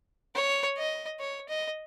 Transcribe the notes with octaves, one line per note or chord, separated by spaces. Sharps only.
C#5
D#5
C#5
D#5